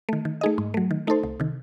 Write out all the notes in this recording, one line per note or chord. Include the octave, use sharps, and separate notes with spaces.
D#3 A3
D#3
A3 D#4 G#4 D#5
G#2
F#3 A3
D#3
A3 D#4 A4 C5
C2
C3 D#3